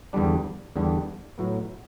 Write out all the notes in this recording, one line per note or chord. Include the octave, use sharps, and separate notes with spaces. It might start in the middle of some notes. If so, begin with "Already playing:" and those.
E2 D3 G3 D4
E2 D3 G3 D4
A2 F#3 B3